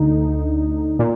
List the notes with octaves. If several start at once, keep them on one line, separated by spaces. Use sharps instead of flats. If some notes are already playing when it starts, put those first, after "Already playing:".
Already playing: D2 D3 D#4
A#2